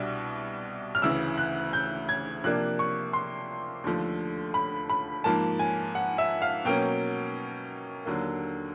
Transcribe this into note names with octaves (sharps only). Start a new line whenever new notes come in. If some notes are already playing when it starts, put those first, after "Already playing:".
Already playing: C2 B2 G3 B3 D4
F6
D2 C#3 E3 E6
F#6
G6
G#6
C3 F3 A#3 D4 F#6
C#6
C6
D#2 D3 F3 A3
B5
B5
G#2 F3 A#3 A5
G#5
F#5
E5
F5
B2 F#3 A#3 C#4 G5
D#2 D3 F#3 A#3